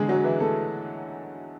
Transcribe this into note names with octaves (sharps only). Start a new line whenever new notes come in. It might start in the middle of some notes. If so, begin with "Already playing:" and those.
Already playing: E2 D3 G#3 G#4
F#3 F#4
E3 E4
A3 A4